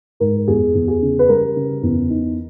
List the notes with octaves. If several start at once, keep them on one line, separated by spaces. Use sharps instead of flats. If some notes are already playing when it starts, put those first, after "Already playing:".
G#2 A#4
E2 G#4
E2
G#4
C#3
B4
G3 A#4
C#3
E2
D#4